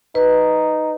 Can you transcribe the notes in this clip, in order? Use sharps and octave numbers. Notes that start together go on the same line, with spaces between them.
D#4 B4